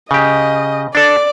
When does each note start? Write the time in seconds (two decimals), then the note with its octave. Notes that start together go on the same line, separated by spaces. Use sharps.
0.11 C#3 G4 D#5
0.95 D4 A4 D5